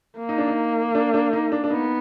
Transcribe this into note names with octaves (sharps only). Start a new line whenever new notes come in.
A#3
D#4
D4
D#4
D4
D4
D#4
D4
D4
B3 D#4